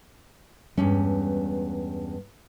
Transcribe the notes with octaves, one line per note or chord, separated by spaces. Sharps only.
E2 G2 G3 G#3 C#4